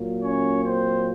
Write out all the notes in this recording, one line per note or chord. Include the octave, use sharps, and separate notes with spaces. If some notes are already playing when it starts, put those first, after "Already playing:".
Already playing: A#2 F#3 A#3
C#4 C#5
C4 C5